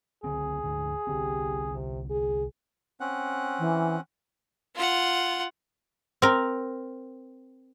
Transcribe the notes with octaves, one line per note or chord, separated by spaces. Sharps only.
C#2 D3 C4 G#4
D2 G#2 D3
C2 D3 C4 G4
C3
G#4
C4 C#4 F#5
E3
F4 F#5
C4 A#4